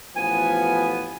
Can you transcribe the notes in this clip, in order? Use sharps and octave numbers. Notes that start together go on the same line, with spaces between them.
A1 F3 B3 G#5